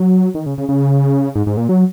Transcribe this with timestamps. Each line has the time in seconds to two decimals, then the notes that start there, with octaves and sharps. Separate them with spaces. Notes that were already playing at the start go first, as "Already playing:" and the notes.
Already playing: F#3
0.35 D#3
0.46 C#3
0.58 C#3
0.69 C#3
1.35 G#2
1.46 G#2
1.57 A#2
1.69 F#3